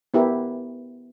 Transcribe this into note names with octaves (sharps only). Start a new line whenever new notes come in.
B3 E4 G4 A#4